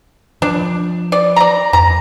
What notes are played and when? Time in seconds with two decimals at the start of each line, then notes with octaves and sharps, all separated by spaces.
0.42 F3 D4
1.12 D5
1.36 D5 A#5
1.73 F2 A#5